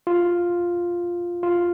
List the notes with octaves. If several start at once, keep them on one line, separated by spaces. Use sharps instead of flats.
F4
F4